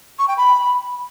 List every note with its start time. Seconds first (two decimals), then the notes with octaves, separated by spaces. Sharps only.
0.19 C#6
0.28 G5
0.37 B5